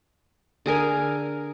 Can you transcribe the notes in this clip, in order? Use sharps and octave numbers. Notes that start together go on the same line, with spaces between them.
D3 G#4 A#4 G#5